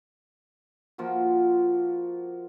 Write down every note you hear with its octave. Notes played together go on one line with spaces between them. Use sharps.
F3 A#3 F4 F#4